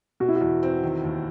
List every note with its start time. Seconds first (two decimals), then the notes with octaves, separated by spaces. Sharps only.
0.20 B2 F#4
0.28 E4
0.36 F#4
0.41 E2
0.63 C4
0.83 D#3
1.04 D#2